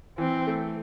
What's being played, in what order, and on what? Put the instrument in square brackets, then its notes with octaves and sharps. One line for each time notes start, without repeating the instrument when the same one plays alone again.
[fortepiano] E3 [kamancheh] C4
[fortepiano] A3